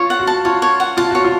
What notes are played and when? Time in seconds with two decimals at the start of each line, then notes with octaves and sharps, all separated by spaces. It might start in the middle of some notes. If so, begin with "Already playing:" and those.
Already playing: F4 C#5
0.10 F#5
0.19 F#4
0.27 A5
0.45 F4 C#5
0.62 C#5
0.80 F#5
0.97 F4 A5
1.11 F#4 C#5
1.25 F4